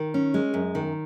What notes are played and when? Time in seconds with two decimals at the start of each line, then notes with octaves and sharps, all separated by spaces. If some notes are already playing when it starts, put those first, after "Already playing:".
Already playing: D#3
0.14 C#4
0.34 G#3
0.54 F#2
0.75 D#3